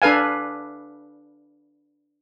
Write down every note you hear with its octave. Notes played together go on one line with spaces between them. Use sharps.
D4 A4 B4 F5 G#5